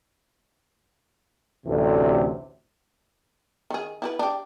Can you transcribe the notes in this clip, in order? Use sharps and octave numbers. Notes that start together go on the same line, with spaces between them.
A1 D2 C3
D#3 G#4
E4 F#4 B4
D4 G4